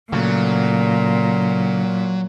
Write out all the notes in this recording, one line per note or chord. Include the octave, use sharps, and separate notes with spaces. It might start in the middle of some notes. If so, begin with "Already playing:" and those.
A#2 C#3 F#3 A3